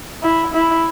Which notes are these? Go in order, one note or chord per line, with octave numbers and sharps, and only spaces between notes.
E4
E4